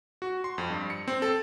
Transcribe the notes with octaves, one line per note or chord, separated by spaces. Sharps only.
F#4
C6
F2
G2
C#7
C4
A4